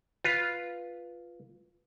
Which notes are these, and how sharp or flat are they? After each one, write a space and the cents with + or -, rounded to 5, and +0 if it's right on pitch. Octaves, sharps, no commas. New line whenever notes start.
F4 +0 B4 +0